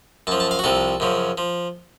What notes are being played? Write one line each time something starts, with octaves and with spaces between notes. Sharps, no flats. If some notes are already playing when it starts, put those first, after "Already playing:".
F#2 F3 A5
A5
F5
F#4
C2 C3 F3 A4
F#2 C#3 F3
F3